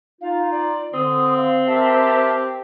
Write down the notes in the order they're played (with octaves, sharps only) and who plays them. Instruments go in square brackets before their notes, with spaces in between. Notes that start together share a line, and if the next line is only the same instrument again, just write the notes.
[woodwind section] D#4 F4 [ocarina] F5
[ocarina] D5
[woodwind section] D3 [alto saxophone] C4 [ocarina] D#6
[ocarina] F5
[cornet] G4 [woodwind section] A#4 E5 [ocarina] A5